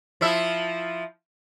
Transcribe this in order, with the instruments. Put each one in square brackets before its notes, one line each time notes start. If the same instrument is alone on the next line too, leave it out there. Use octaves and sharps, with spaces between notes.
[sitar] F3 E4 E5